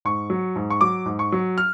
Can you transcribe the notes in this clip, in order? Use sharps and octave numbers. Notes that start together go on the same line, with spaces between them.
G#2 C#6
F#3
G#2
C#6
F#3 D6
G#2
C#6
F#3
F6